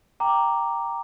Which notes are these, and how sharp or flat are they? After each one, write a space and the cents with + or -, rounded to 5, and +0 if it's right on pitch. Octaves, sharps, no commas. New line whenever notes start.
G5 +0 A#5 +0 D6 +0